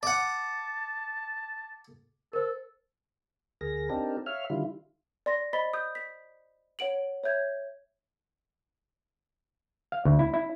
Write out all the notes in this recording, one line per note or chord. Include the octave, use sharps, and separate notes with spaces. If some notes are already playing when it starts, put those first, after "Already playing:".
D5 F#5 A5
A4 A#4 C5
D2 G#4 A#4 A#6
C4 D4 D#4 G4 A4 A#4
C#5 E5 F5 F6
D3 D#3 G3 E4 F4
D5 C6 A#6
C5 D#5 B5 A6 B6 G7
D#6 G6
B6
C#5 F#5 D7 F#7
C#5 E5 G6 G#6
F5
D2
E4
E4